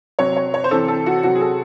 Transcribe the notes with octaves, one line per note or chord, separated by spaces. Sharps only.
C3 F#3 C#5
C#5
C#5
C5
C3 E3 A4
A4
F#4
C3 F#3 F#4
G#4
A4